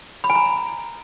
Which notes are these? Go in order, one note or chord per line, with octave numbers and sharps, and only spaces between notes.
B5
G#5
A#5